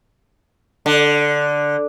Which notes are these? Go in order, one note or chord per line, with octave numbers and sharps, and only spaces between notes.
D3